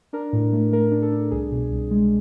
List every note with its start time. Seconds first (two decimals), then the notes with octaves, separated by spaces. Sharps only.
0.13 D4 A#4
0.33 A2
0.52 A3
0.72 A3 A#4
0.92 D4
1.02 A4
1.12 D4
1.31 C2 G#4
1.52 B2
1.72 C2
1.91 G#3